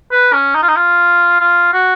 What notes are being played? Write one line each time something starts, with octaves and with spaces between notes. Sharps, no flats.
B4
C#4
D#4
F4
D#4
F4
F4
F#4